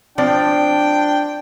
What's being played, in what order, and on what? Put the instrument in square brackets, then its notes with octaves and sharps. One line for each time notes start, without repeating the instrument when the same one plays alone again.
[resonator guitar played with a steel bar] F3 C4 D5 [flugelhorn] D4 [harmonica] G5